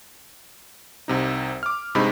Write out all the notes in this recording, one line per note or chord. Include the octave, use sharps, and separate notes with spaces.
C2 C3 D#4
D6 F6
G1 G2 C3 G#3 D#4 B5